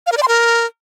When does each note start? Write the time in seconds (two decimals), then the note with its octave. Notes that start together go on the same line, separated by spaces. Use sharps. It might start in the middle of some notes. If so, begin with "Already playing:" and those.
0.07 F5
0.12 A#4
0.17 D5
0.23 C6
0.28 A#4